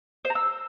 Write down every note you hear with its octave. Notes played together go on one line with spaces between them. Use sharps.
C5
A#5
E6